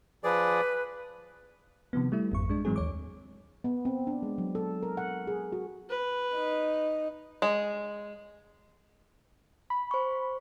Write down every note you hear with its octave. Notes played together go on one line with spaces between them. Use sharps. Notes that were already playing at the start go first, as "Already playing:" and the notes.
F3 G#4 B4 D5
C3 D#3 F3 B3
G3 A3 E4
G#1 F2 C#6
G#3 D4
G#2 E3 F#3 G#3 C4 G#4
D#2 C#5 D6
B3
C4
D4
G#3
F#3
A4
A#4
F#5
G#4
F#4
B4
D#4
G#3
B5
C5 C#6